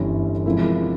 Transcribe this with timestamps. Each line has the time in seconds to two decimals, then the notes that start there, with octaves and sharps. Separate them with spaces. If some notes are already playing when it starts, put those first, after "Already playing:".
Already playing: G1 G2 E3 G3 C#4
0.46 C3 F3 G#3 E4 A#4